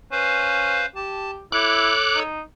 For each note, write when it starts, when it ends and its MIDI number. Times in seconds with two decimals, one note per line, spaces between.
0.11 0.85 61
0.11 0.86 71
0.11 0.86 72
0.11 0.86 77
0.95 1.40 67
0.95 1.31 81
1.52 1.92 64
1.52 2.23 69
1.52 2.23 73
1.52 2.20 86
1.52 2.20 90
2.15 2.40 63